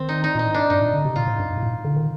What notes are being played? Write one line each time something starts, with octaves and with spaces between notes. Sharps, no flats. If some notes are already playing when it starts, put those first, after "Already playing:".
Already playing: D#3 C4
D#4
D#4
A#2 D#4
A2
D4
G2 D#4
A#2
D3
C3
A#2 F4
A2
G2
G2
A2
A#2
D3
D#3